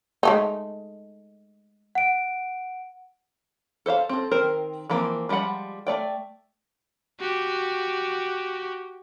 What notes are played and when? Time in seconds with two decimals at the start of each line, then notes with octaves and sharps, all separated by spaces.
0.23 G#3 A3 D#4
1.95 F#5 D7
3.86 A4 C5 E5 F5
4.09 C4 A4
4.31 D#3 C4 A#4 C5
4.90 E3 F3 A#3 C4
5.29 F3 G3 G#3 F#5 B5
5.87 A3 D5 G5
7.20 F#4 G4